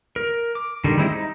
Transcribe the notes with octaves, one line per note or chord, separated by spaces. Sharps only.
A#4
D6
D3 D#3 G3
G3 G#3 C4 E4
D#4